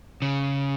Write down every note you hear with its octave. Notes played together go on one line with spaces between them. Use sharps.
C#3